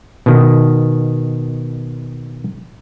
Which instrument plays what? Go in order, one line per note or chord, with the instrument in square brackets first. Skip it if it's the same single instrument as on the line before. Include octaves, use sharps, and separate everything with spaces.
[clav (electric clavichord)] B2 D#3